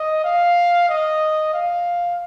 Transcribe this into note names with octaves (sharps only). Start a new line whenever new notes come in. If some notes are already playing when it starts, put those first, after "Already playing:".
Already playing: D#5
F5
D#5
F5